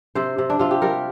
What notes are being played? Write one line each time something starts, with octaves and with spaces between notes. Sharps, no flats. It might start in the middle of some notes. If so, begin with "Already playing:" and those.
C3 C5
C3
D4
C3 F4
G4
G3 A#4